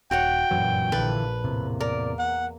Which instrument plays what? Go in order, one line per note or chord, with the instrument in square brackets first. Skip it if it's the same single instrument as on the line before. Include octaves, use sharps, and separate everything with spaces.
[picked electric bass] D#1 [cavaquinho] F#4 C#5 F#5 [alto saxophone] G5
[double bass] G1 A#2 [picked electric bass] F#2 E3 F#3
[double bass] A#1 [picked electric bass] D3 E3 [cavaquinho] B4 A5
[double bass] E2 A#3 [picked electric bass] A2 C3
[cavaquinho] A#4 [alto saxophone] D5
[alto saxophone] F#5